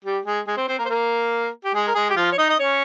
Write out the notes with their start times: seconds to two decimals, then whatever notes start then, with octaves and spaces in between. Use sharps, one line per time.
0.05 G3 G4
0.25 G#3 G#4
0.47 G#3 G#4
0.57 C4 C5
0.68 C4 C5
0.79 A#3 A#4
0.86 C5
0.89 A#3 A#4
1.65 G4
1.74 G#3 G#4
1.88 A#4
1.95 G#3 G#4
2.10 G4
2.16 F3 F4
2.32 C#5
2.38 D#4 D#5
2.50 D#5
2.59 C#4 C#5